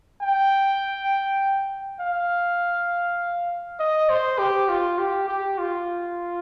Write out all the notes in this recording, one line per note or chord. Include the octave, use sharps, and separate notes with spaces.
G5
F5
D#5
C5
G4
F4
G4
G4
F4